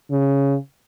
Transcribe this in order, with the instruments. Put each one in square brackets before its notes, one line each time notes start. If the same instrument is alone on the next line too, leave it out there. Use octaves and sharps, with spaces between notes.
[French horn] C#3